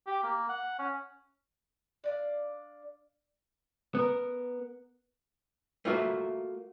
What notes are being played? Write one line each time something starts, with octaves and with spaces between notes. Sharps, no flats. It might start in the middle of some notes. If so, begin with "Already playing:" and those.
G4
A#3
F#5
C#4
D4 D5 F5
B3 A#4
A3 A#3 F4 F#4 E5